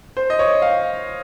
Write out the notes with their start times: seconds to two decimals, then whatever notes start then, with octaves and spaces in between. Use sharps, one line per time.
0.17 C5
0.30 D#5
0.39 C#5
0.62 F5